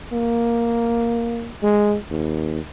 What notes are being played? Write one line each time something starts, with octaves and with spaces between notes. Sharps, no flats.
A#3
G#3
D#2